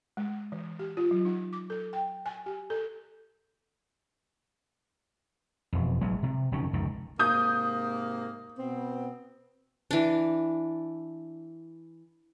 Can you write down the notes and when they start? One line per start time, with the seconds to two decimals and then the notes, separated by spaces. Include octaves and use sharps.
0.17 G#3
0.52 E3
0.79 G4
0.97 F4
1.11 F#3
1.25 D#4
1.53 D6
1.70 A4
1.93 G5
2.26 G#5
2.46 G4
2.70 A4
5.73 E1 F2
6.01 A1 F#3 G#3
6.23 C3
6.52 F#1 F2 D#3 C#4
6.73 F1 C#2 F#2 D#3
7.19 G#2 C3 A#3 D#6 G6
8.58 B2 B3 C4
9.91 E3 D4